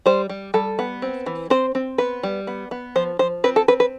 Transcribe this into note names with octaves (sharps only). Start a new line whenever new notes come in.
G3 C5
G3
G3 A4
B3
C4
E3
C4 C5
C4
B3 B4
G3
B3
B3
F3 C5
F3 C5
C4 B4
A4
C4 B4
B4